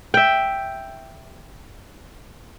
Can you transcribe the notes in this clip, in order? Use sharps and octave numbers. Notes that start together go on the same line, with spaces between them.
E5 G5